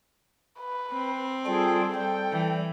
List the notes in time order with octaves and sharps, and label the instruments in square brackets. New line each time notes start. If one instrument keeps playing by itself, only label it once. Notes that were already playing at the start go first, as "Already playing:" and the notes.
[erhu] B4
[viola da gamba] C4
[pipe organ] G3 F4 G5 [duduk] G#4 [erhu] A4
[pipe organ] G3 [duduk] A4 [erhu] G5
[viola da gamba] E3